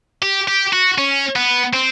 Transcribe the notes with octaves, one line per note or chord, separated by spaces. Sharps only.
G4
G4
F#4
C#4
B3
C4